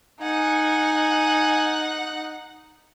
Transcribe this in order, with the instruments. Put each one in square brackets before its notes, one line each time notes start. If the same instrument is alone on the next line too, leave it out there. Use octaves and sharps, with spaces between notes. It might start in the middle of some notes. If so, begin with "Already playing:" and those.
[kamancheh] D#4 [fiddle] F#5 [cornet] G#5